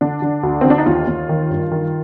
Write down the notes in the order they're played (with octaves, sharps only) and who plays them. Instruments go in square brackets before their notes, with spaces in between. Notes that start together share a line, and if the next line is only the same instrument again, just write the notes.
[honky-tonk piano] D3 D4
D3
D2
C4
D3
D4
D#4
D#2 F4
D#2
D#3
G2
D#3